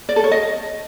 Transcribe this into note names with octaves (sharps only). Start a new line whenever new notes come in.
D5
A4
C#5
D#5